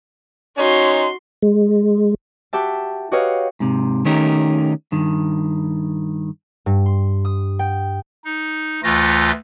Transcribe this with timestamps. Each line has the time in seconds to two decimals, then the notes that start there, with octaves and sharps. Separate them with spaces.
0.58 C#4 D#4 F#4 C6
1.42 G#3
2.53 F#4 G4 E5 A5
3.12 F#4 G4 B4 C#5 D#5 F5
3.60 G#2 C3
4.05 D#3 A3 C#4 D#4 G4 A#4
4.92 G2 D#3
6.66 G2
6.86 C6
7.25 D#6
7.59 G5
8.25 D#4
8.83 D2 E3 A3 F4 A#6